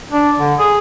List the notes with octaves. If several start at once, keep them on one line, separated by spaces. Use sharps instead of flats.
D4
D3
G#4